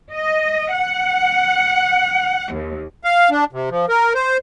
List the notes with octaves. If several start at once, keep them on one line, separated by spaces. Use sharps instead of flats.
D#5
F#5
D#2
F5
D4
C3
F3
A#4
C5